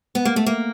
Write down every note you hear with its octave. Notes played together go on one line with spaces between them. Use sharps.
B3
A#3
A3
A#3